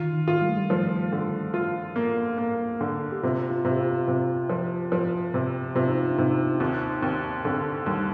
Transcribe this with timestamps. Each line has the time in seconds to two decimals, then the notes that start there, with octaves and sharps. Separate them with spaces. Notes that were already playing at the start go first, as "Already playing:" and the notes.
Already playing: D#3 F4
0.13 D#3
0.28 F4
0.42 G3
0.49 A3
0.58 G3
0.70 F3
1.12 D3
1.54 F4
1.96 A#3
2.38 A#3
2.81 D3
3.12 G4
3.23 C3 F4
3.51 F4
3.65 C3
3.70 G4
3.79 F4
4.07 C3 F4
4.49 F3
4.92 F3
5.34 C3
5.75 C3 F4
5.88 D#4
5.99 F4
6.11 D4
6.18 C3 D#4
6.60 D#2 C4
7.02 D#2 C4
7.45 D3 C4
7.86 D#2 G3